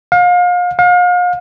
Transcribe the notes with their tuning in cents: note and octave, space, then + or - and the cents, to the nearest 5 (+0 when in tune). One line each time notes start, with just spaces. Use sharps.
F5 +35
F5 +40